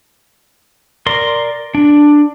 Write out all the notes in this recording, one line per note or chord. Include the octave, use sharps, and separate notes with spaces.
A#4 D5 C6
D4